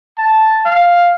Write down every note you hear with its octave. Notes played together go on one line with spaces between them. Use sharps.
A5
F5